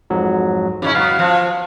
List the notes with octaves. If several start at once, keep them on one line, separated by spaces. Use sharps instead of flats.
F2 G#2 F#3
C#3 E3 C#4 D#4 E4
F#3 B3 F5
F3